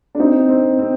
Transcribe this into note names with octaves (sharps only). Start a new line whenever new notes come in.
D4
C4 D#4
C4
C4